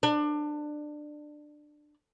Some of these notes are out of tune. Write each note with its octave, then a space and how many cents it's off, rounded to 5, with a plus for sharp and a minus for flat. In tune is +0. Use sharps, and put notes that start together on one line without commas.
D4 +20